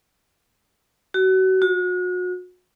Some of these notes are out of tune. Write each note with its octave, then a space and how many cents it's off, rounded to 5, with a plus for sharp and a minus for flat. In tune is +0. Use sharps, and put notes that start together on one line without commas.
F#4 +30
F#4 -35